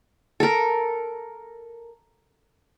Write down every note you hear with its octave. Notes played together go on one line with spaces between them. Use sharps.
A4 A#4